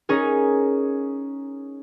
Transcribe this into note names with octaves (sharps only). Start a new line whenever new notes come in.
C#4 D#4 G#4 A#4